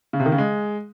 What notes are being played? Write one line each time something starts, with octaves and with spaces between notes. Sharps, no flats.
C#3
C3
D#3
C#3
G#3